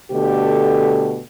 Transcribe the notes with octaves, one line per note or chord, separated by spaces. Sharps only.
B2 D3 A3 G4